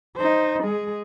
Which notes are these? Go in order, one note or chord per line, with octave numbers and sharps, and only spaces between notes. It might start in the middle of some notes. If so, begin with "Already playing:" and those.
D#4 C5
G#3 G#4